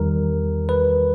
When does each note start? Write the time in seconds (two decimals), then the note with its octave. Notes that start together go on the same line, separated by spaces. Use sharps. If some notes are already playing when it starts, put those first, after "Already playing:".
Already playing: E2 D#3 G3 A#4
0.69 B4